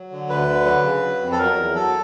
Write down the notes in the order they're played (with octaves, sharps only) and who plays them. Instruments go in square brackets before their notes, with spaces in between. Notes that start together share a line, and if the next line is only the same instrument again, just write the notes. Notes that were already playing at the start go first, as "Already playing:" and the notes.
Already playing: [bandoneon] F#3
D3
D2 B4
D3
F#3
C#3
F#3
F2
A4
F#3 A#4
E2
F#3 A4